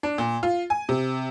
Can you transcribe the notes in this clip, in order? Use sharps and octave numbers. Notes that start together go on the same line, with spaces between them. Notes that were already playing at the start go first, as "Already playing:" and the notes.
D4
A#2
F4
G#5
C3